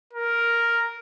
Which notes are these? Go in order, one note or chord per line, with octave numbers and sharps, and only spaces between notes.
A#4